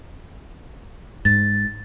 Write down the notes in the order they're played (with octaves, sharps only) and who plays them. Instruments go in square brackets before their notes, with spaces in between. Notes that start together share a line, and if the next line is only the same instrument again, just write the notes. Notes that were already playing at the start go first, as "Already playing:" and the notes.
[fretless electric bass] G#2 [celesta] A6